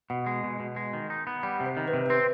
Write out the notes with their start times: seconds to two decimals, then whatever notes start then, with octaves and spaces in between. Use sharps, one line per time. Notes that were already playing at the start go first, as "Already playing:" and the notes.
0.10 B2 F#5
0.26 G#3
0.43 B2
0.60 B2
0.76 G#3
0.93 D#3
1.10 D#4
1.27 B3
1.43 G3 F#5
1.60 C3
1.66 C5
1.77 D#3
1.88 B4
1.94 C3
2.06 C5
2.09 C4 B4